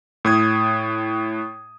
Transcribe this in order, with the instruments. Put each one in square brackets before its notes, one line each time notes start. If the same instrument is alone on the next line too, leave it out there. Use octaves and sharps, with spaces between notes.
[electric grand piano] A2 D#6 G#6